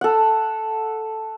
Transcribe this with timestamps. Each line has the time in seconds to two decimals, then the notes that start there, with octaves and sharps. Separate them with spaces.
0.01 A4 F#5